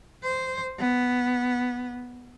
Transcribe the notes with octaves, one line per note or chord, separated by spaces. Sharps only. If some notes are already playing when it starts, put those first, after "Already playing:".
C5
B3